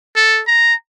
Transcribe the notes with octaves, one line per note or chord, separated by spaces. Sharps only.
A4
A#5